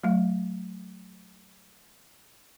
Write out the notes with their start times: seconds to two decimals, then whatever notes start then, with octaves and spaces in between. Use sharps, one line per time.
0.03 F#3 A3 F5